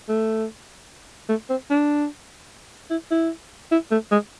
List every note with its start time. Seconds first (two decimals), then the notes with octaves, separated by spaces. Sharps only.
0.09 A3
1.29 A3
1.49 C4
1.70 D4
2.90 E4
3.11 E4
3.71 E4
3.91 A3
4.11 G#3